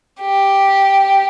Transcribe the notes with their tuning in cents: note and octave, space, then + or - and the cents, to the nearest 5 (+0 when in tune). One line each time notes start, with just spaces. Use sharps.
G4 +0